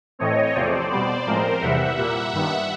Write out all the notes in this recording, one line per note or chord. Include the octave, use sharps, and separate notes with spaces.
A2 E3 A3 C4 C#5 D#5
E2 C3 F3 A3 C4 C5 D5
B2 G3 B3 C5 D5
A2 F3 G#3 C4 A#4 C5
E2 C3 E3 G3 E5 F#5
A#2 G3 A#3
G2 D#3 G3 B3